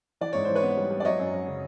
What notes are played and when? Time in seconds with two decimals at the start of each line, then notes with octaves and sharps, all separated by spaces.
0.21 E3 D5
0.33 G#2 C#5
0.45 E3 C5
0.55 B4 C#5
0.63 B3
0.77 G3
0.91 G3
1.00 D5
1.05 F#3 C#5 D#5
1.19 F#2
1.34 F#3
1.48 C#3